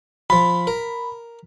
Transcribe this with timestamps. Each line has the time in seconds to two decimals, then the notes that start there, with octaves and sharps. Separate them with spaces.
0.30 F3 F4 B5
0.67 A#4